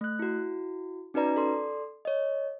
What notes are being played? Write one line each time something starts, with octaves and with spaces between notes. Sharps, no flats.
A3 F#6
E4 F#4
C#4 D#4 F#4 B4 D5 A#5
A4 D5 C6
C#5 D#5